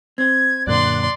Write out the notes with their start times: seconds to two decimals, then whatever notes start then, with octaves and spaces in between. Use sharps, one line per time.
0.18 C4 C5 G#6
0.67 F#2 A#2 D3 D5 C6 F#6